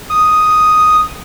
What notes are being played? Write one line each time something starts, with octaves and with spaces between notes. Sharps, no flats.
D#6